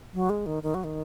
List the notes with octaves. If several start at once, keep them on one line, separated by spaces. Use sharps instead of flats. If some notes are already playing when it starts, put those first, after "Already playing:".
F#3
G#3
D#3
D#3
F#3
D#3